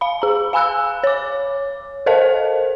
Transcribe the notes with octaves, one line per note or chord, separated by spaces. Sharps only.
F5 B5
G#4 A#5
F5 G#5 B5 E6 F#6
C#5 D6
A4 A#4 C5 D#5 F5 A5